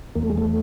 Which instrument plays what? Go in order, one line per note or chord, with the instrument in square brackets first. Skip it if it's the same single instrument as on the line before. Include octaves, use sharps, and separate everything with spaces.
[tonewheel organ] E2 A#3
A3
G#3
A3